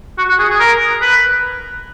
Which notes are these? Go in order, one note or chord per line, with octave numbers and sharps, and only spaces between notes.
F#4
F#4
G#4
G#4
A#4
B4